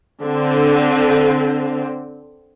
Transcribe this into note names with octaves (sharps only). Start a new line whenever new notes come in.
D3 C4